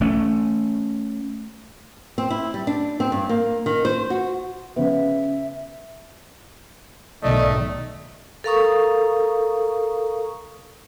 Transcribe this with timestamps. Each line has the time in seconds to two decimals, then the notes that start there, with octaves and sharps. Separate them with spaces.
0.01 A3 C#4
2.18 C4
2.30 E4
2.54 G3
2.67 D4
3.00 C4
3.12 G2
3.29 A#3
3.66 D#3
3.85 C5
4.10 F#4
4.76 C#3 B3 E5
7.23 B1 G#2 D#3 A3 D5 D#5
8.44 A4 A#4 F5 A#5 C#6 D#6